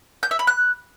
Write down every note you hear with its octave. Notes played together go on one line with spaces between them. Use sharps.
G6
E5
B5
F#6